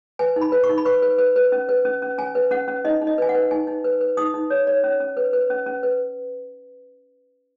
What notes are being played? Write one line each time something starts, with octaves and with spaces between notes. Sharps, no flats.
B4 G#5
D#4
B5
B4
C#6
D#4
B5
B4 C#6
B4
B4
B4
C#4
B4
C#4
C#4
C#4 G#5
B4
C#4 F#5
C#4
D#4 D#5
D#4
D#5
B4 G#5
F#5
B4
D#4 G#5
D#4
B4
B4
D#4 D#6
D#4
C#5
C#5
C#4
C#4
B4
B4
C#4
C#4
B4